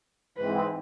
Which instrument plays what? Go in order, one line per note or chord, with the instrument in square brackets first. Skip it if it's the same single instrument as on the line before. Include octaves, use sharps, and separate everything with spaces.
[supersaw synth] G#2 E3 G#3 C4 [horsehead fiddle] B4